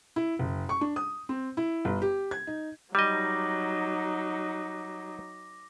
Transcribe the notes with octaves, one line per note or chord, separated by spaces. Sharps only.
E4
F#1
C#6
D4
D#6
C4
E4
G1
G4
G#6
D#4
F#3 G3 D#4 D#5 D6 A#6